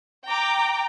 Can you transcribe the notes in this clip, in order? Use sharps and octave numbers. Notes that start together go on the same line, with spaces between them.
G5 A#5 D6